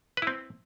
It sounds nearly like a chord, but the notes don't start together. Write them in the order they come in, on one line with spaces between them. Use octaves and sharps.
B4 E4 C4